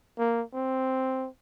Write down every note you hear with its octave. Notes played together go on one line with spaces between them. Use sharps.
A#3
C4